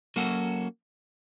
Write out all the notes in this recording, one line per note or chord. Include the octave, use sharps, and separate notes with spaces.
F#3 A#3 C#4 F#4 A4